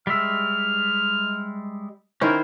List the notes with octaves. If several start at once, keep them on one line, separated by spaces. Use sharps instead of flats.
G3 G#3 E5 F6
D#3 C#4 E4 A#4 C5